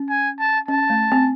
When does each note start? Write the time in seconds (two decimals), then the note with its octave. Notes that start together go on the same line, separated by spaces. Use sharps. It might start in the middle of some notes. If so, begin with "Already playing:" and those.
Already playing: C#4
0.10 G#5
0.39 A5
0.68 C#4 A5
0.90 A3
1.12 C4